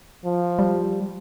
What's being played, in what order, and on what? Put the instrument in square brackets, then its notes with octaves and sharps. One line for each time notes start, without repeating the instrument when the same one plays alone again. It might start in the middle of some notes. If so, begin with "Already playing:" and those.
[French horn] F3
[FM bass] G3